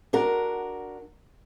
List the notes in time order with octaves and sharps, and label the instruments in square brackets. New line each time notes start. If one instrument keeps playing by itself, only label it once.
[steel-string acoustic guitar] D4 F#4 A#4